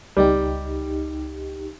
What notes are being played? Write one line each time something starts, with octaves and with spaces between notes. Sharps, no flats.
C#2 G3 D#4 G4